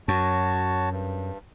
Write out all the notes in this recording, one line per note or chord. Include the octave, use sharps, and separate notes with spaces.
F#2 F#4 C#5 A5
G2